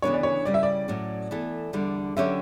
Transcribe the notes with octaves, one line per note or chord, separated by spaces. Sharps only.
D2 C#3 E3 B3 D4 C#5
D5
C#5
C#3 G3 C#4 E4 G4 D5
E5
D5
A2 F#3 C#4
E3 B3 E4 A4
E2 D3 G3
D3 F#3 C#4 G4 C#5 E5